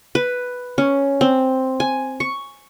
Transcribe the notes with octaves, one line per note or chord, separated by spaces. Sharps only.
B4
C#4
C4
G#5
C#6